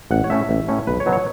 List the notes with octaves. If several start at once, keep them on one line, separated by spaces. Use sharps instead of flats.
A1 F#5
C#5
A2 A3 C#4 E5
A1
A2 A3 C#4
B1 B4
C#5
B2 F#3
C#5